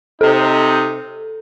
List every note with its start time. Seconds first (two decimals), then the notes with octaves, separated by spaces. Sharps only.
0.21 C3 D#4 A4